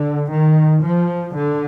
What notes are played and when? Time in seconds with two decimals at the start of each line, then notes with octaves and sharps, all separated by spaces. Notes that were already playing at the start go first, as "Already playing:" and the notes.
Already playing: D3
0.32 D#3
0.84 F3
1.36 D3